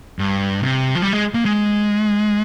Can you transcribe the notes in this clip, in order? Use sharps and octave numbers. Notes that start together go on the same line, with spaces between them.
G2
C3
F3
G3
G#3
A#3
G#3